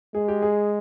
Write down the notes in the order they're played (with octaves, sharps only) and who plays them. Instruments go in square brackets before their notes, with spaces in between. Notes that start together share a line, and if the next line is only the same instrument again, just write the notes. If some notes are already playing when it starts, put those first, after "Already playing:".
[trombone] G#3 [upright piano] G#4
[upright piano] G4
G#4